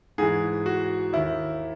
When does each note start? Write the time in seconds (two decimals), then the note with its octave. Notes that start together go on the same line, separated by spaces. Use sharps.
0.18 G#2 E3 G#4
0.66 F#4
1.13 D#2 D#3 E4